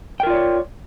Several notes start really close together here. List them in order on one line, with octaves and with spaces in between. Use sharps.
G5 A#4 F4 D5 C#5